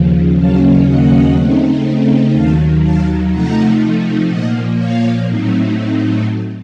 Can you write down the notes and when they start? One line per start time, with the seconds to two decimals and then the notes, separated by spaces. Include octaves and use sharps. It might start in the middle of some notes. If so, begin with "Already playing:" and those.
Already playing: D#2 C#3 F3
0.38 D#2 C#3 F#3 A#3 C#4 F5 A5
0.87 D#5 F#5
1.36 C#3 A3 C4 D#4
2.33 D#2 D#3 F#3 F5 A5
2.83 F5 A5
3.31 C3 F3 A3 D#4 F#5 A#5
4.28 A#2 F3 A#3 D#5 F#5
4.77 C#5 F5
5.27 A2 F#3 A3 C4 D#4